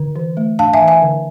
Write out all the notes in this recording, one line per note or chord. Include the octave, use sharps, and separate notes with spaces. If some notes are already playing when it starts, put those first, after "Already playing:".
Already playing: D3
E3
A3
D4 F5 A5
E5 G#5
E3
E5 G#5
D3